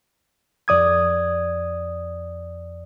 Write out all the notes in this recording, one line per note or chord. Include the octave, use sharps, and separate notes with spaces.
F2 D5 D#6 G#6